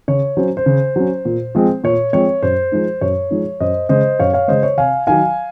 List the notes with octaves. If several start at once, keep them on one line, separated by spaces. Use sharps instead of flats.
C#3 C#5
F#3 C#4 C5
C5
C#3
F#3 C#4
A#2
F3 G#3 C4
A#2 C#5
F3 G#3 C4 C#5
F#2 C5
F3 G#3 D#4
F#2 C#5
F3 G#3 D#4
F#2 C5 D#5
C#3 G#3 C5 D#5
F#2 C#5 F5
C#5 F5
C#3 G#3 C5 D#5
C#5
C3 F5 G#5
D#3 F#3 F5 G#5